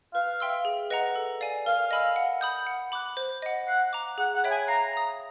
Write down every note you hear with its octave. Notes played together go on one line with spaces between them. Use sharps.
B4 F5
E5 G5 C6 E6
G#4
B4 D#5 F#5 A#5
A4
D5 F5 G#5
A#4 F5
D#5 G#5 B5 E6
F#5
B5 D#6 G6
F#5
B5 D6 F#6
C5
D#5 F#5
F5 F#5
A#5 D6
G#4 F#5
F#5
C#5 E5 G5 B5
G#5
F5 A#5
A#5 D#6